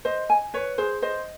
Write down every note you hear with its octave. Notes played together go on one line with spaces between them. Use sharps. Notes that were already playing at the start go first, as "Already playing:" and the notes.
C5 D#5
G#5
B4 C#5
G#4 C5
C5 D#5